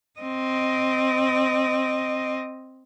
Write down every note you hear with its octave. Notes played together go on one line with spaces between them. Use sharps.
C4 D#5